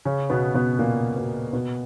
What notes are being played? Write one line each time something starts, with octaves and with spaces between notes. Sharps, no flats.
C#3 C#4
B2 B3
B2 B3
A#2 A#3
B2 B3
B2 B3